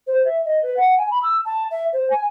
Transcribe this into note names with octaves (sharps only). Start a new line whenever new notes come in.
C5
E5
D#5
B4
F#5
G#5
B5
E6
A5
E5
C5
G#5